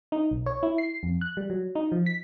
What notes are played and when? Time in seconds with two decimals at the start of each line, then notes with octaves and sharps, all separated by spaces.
0.12 D#4
0.31 B1
0.46 C#5
0.63 E4
0.78 C7
1.03 F2
1.21 F#6
1.37 G3
1.50 F#3
1.75 D#4
1.92 F3
2.06 B6